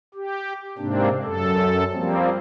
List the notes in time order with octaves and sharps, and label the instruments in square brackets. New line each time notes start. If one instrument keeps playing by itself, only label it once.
[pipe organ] G4
G#2 C3 A#3 C4 D4
F#2 A4
F3 G3 A#3 C4